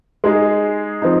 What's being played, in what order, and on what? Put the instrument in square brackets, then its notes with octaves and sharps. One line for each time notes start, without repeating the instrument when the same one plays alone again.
[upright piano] G#3 D#4 G#4
F3 C4 D#4